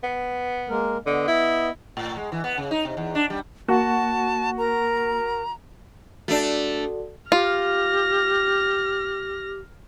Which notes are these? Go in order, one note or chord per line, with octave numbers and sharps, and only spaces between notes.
B3
G#3 A#3 A#4
D3 B3 D#5
E4
A2
G#3
E3
B3
C#3
D#4
C3
E2
D4
G3
A#3 F#4 A5
A#4 A#5
A3 D4 F#4 A4 D5
F4 G4 F6 A#6